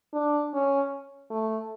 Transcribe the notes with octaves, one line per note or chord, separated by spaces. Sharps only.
D4
C#4
A3